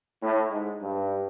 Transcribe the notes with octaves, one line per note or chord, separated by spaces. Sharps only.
A2
G#2
G2